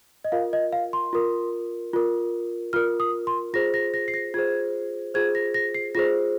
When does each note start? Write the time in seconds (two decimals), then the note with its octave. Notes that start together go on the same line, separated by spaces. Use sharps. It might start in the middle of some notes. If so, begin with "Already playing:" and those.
0.25 D#5
0.32 F4 A#4 F5
0.53 D#5
0.73 F5
0.93 C6
1.13 F4 A#4
1.93 F4 A#4
2.73 F4 A#4 F6
3.00 D#6
3.27 C6
3.54 F4 G#4 C5 A#6
3.74 A#6
3.94 A#6
4.08 C7
4.14 A#6
4.34 F4 G#4 C5 G#6
5.14 F4 G#4 C5 G#6
5.35 A#6
5.54 A#6
5.74 C7
5.95 F4 G#4 C5 A#6